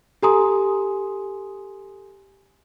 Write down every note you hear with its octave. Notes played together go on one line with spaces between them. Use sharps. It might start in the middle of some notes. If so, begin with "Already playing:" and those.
G4 A4 G#5 A#5 C6 D#6